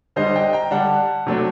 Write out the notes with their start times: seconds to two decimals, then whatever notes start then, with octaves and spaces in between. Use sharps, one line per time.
0.16 D3 G3 D4 C5 D#5
0.36 D#5 G5
0.53 G5 A#5
0.71 D3 G3 D4 F#5 A5
1.27 C3 F#3 A3 D4